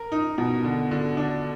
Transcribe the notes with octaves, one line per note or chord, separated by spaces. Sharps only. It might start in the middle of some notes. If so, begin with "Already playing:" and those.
Already playing: A#4
D#4
B2
D3
D3
D4